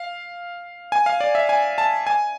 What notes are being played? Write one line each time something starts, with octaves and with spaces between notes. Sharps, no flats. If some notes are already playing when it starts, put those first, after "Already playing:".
Already playing: F5
G#5
F5
D5
E5
G#5
A5
G#5